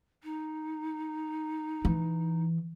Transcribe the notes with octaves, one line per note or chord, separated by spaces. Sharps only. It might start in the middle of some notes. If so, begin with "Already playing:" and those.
D#4
E3